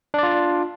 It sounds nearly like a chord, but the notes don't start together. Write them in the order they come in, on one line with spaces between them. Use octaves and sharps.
D4 D5 F4